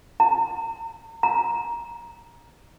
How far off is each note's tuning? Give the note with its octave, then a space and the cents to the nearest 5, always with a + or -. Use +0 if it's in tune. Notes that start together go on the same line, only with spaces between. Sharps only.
A#5 -35
A#5 +15